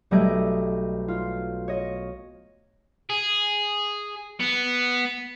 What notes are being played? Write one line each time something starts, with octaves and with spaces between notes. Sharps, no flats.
B1 G3 A3 D#5 G#6 D7
F4
C#5 D#5
G#4
B3